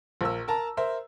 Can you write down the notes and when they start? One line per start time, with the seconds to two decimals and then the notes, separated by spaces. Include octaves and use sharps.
0.21 A#1 A#4 E6
0.48 A#4 A5 A#5
0.77 A#4 C5 E5